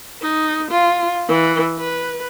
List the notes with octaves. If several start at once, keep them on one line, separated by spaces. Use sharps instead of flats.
D#4
F4
E3
B4